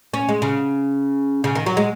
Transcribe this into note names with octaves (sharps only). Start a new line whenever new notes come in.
C#4
G#3
C#3
C#3
D#3
F#3
G#3